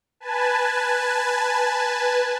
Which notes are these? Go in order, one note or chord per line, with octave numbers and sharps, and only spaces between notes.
B4 G#5 A5